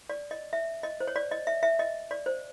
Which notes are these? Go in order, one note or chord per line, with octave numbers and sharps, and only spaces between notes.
D5
D#5
E5
D#5
C5
C#5
D5
D#5
E5
E5
D#5
D5
C5